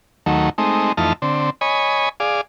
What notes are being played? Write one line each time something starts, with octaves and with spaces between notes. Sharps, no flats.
D#2 D#3 F#3 A3
G#3 A3 C4 D#4
F2 E3 A3 D#4 A5 F6
D3 C4
C#5 D#5 G#5 B5
G#4 D5 F5